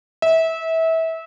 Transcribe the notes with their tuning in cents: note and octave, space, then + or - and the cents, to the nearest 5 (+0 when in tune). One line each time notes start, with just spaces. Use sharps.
E5 -25